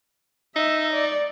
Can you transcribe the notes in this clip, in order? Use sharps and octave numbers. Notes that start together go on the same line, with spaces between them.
D#4 E5
D5